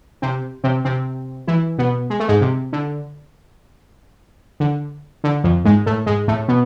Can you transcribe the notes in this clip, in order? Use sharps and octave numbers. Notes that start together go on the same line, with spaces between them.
C3 C4
C3 C4
C3 C4
E3 E4
B2 B3
G#3
A3
G#2 G#3
C3
D3
D3
D3
F2 F3
G#2 G#3
A2 A3
G#2 G#3
A2 A3
B2 B3